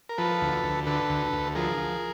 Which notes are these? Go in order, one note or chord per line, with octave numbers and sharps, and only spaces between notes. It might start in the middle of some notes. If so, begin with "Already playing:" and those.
A#4
F3 A4 B4
D2
D2
D3 A4 B4
D2
D2
F3 G#4 A#4
F3